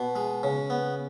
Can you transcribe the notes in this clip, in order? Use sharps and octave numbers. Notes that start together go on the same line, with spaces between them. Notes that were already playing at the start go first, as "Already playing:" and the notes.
Already playing: B2
G#3
C#3
B3